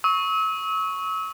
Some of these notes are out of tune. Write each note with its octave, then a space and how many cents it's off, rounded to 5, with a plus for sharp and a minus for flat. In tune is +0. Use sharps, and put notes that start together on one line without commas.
C#6 +0 E6 -40